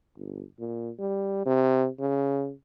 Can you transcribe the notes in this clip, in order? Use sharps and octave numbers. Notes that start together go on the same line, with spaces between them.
G1
A#2
G3
C3
C#3